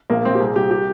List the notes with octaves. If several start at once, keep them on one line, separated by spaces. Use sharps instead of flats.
A#1 A#3
A#1 C4
G4
C2 G#4
C2 G4
G4